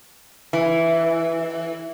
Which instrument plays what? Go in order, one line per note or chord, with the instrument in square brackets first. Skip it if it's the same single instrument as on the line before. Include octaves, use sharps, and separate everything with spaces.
[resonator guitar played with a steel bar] E3